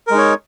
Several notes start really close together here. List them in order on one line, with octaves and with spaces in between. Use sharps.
A#4 G#3 D#4 C#5